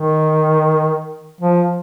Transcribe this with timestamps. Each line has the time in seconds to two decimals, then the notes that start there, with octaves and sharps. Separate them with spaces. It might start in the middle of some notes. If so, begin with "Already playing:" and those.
Already playing: D#3
1.40 F3